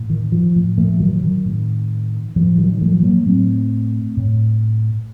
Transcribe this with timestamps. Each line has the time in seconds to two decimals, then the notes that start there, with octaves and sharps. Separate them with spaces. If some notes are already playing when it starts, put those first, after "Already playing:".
Already playing: A2
0.10 D#3
0.32 F3
0.56 A2
0.78 F3 A3
1.00 D#3 F#3
1.23 D#3
1.45 A2
2.36 A2 F3
2.58 D#3 F#3
2.81 F3 A3
3.03 F#3 A#3
3.26 A2 A3 C4
4.17 A2